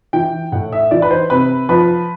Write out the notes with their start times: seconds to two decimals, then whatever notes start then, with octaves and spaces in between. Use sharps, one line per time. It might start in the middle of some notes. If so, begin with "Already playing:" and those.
0.13 E3 G5
0.52 A2 F#5
0.72 E5
0.91 E3 D5
1.02 B4
1.11 C5
1.30 C3 B4
1.69 F3 B4